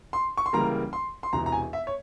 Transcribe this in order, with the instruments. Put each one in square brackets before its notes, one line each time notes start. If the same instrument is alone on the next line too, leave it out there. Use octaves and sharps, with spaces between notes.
[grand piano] C6
C#6
C6
C#2 C#3 E3 G3 A#3 A#5
C6
C6
E1 E2 C3 E3 A#5
A#5
G#5
E5
C#5